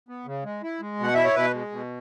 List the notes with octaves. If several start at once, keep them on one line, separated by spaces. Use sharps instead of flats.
B3
C#3
G#3
E4
G#3
B2 F#5
E4 E5
C#5
B2 B4
G#3
B2